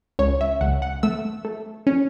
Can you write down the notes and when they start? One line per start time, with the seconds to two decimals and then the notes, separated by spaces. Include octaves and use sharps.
0.19 C#2 C#5
0.41 E5
0.61 C#2 F#5
0.82 F#5
1.03 A3 E6
1.45 A3
1.87 C#4